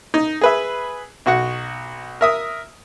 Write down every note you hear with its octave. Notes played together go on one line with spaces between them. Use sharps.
D#4
G#4 B4 E5
B1 F#4 F#5
A#4 E5 D#6